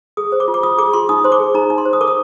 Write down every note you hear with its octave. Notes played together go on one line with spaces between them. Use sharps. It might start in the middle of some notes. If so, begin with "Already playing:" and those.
G#4 D#6
C5
D6
F4
D6
F4 D#6
G#4 D6
F4 C6
D#4 D#6
C5 C6
D6
G#4
D#4 A#5
D#4
C6
C5
D#6
A#4 D6
D#6